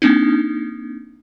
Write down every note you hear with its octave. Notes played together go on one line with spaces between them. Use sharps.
A#3 C4 D4 D#4